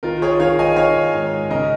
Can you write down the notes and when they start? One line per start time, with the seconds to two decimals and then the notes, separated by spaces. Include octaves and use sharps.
0.03 D#3 F4 A#4
0.22 G#4 C#5
0.40 D#3 C#5 F5
0.59 D#5 G#5
0.76 D#3 C#5 F5
1.14 G#2
1.50 C#3 A#4 D#5